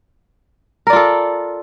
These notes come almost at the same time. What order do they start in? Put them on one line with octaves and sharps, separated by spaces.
A#4 D5 F4 A4